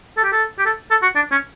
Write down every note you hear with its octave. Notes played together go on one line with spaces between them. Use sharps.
A4
G4
A4
G4
A4
A4
F#4
D4
C#4